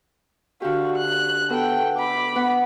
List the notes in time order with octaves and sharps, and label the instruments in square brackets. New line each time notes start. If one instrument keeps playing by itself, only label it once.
[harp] D3 G4 [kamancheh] F#4 F5
[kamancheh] F#6
[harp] B3 F#4 [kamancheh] A4 G5
[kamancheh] B5 D6
[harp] B3 F#5